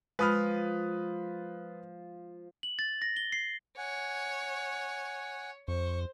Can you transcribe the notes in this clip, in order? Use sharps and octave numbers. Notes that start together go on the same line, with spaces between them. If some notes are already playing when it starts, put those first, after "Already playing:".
F3 G#3 B4 B5 D#6 F6
F#7
A6
A#6
G7
C7
C#5 F#5 G#5
F2 C5 C#6